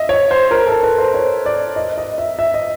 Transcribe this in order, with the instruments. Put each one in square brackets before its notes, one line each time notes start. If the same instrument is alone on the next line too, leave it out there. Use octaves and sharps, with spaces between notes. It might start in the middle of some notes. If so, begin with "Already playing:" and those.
Already playing: [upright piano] D#5 E5
C#5
C5
A#4
A4
B4
C5
C#5
D5
D#5
D#5
E5
E5
D#5